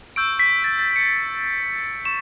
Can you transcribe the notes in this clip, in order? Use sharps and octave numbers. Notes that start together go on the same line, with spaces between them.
C#6 E6 G6 D7
B6
A6
A6
C#7
C#6 E7